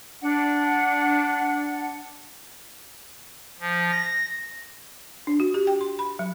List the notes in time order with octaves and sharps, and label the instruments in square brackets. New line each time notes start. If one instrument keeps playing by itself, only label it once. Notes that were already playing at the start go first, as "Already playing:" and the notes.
[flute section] D4 F#5
[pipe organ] F3
A#6
[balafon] D4
F#4
G4
G5
C6
B5
F#3